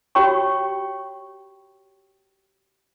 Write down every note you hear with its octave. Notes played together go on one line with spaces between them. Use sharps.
F#4 G4 C#5 G5 C#6